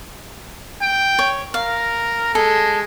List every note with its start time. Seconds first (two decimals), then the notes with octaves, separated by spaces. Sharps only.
0.82 G5
1.19 C#5
1.54 A#4 F5
2.35 G#3 A4